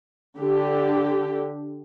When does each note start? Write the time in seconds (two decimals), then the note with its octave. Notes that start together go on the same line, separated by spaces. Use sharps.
0.37 D3 G4